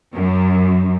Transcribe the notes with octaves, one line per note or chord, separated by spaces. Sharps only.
F#2